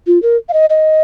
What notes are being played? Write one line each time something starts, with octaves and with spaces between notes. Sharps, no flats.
F4
A#4
F5
D#5
D#5